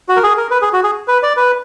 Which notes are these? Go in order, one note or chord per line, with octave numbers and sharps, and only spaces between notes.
F#4
A#4
G#4
A#4
B4
G#4
F#4
G#4
B4
D5
B4